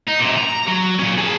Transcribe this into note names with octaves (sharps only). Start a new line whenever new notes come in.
D#4
F#2 A#2
A#5
F#3
A#2 C#4
G#4 A5